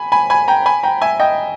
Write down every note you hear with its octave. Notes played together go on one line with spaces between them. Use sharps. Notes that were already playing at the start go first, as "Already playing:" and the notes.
Already playing: G#5 B5
G#5 B5
G#5 B5
G5 A#5
G#5 B5
G5 A#5
E5 G#5
D#5 G5